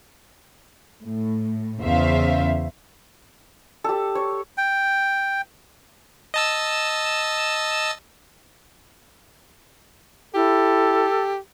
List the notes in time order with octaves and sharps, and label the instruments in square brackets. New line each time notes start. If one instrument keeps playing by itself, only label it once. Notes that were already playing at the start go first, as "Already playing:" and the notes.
[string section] A2
E2 C#3 C5 E5 F5
[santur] G4 A4
C#5
[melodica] G5
[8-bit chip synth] D#5 A5 E6
[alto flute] E4 [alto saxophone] G4 [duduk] A4